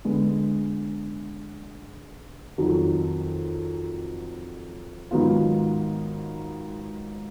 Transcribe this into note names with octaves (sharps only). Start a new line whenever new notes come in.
D3 G#3 B3
F2 D#3 F#3
G#2 D#3 F#3 B3 F4